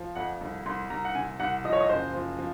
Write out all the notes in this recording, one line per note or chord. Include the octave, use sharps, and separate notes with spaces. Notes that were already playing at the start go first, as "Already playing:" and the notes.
Already playing: F3
F2 F#5
C2
C2 C6
C2 A#5
F#5
C3 G#5
C2 F#5
F3 D#5
C#5
D#5
F#1 C5
F3
F3